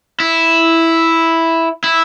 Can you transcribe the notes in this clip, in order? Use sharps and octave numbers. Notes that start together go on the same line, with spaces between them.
E4
E4